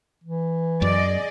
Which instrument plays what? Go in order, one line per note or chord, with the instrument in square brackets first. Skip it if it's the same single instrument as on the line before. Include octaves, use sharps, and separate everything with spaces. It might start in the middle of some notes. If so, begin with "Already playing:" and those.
[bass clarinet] E3
[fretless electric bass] F#2 [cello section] G#4 D5 D#5